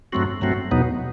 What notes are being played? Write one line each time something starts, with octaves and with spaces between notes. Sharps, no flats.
G2 F#3 A3 C4 F#4
G2 F#3 A3 C4 F#4
E2 B2 F#3 B3 D#4